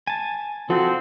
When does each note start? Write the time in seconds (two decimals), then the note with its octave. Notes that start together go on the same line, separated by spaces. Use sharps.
0.07 G#5 A5
0.70 F3 C4 F4 F#4 A4